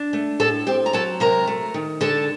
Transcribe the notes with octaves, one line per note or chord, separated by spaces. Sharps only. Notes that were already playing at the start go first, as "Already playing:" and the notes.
Already playing: D4
A3
A2 A4 A5
C4 G4 G5
A#5
F#3 A4 A5
C3 A#4 A#5
A3
D#3
D3 A4 A5